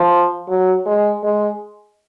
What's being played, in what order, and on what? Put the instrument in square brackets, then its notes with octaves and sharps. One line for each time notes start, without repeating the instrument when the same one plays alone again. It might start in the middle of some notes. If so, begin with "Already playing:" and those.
Already playing: [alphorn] F3
F#3
G#3
G#3